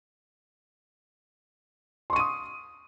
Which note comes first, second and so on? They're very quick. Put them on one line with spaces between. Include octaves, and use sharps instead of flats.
C6 C#6 D#7 D#6